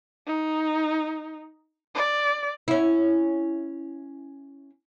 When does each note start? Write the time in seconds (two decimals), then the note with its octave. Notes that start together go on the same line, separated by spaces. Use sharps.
0.27 D#4
1.95 D5
2.68 C#4 E4